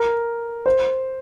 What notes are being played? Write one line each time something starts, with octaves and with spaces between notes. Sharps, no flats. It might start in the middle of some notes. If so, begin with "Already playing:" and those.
Already playing: A#4
C5